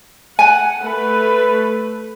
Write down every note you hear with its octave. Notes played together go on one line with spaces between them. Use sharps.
F#5 G#5
A3 B4